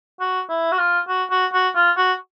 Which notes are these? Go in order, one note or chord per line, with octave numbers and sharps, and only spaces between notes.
F#4
E4
F#4
F4
F#4
F#4
F#4
F4
F#4